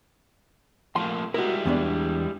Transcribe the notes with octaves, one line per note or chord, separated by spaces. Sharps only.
F3 A3 A#3 C6
G3 G#3 E4 F#4 A#4
E2 B3 D4